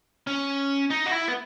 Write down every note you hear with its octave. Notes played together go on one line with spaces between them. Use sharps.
C#4
D#4
F#4
E4
B3